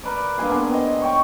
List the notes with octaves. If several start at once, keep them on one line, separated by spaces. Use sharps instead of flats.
A#4 B4 D5
G2 A#3 G#5 C6
B3 D4 G#4
C4 D#5
C#5 G5 C#6